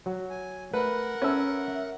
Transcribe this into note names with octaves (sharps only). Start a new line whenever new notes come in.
F#3 F#4
G#5
A3 A#4 B4 F#5
C#4 A4 B4 E5 E6